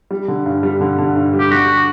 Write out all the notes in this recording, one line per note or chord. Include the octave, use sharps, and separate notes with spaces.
G3
D3
G2
G3
D3
D3
G2
G3
G4
D3 F#4